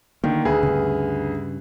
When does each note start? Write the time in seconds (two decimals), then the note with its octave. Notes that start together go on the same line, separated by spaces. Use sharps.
0.24 D3 D#3 A#3
0.45 D2 G#4 B4
0.63 G2 C#3